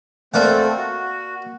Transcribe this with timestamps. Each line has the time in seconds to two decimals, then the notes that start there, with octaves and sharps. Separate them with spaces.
0.34 A3 A#3 C4 A4 D5 F#5
0.78 F#4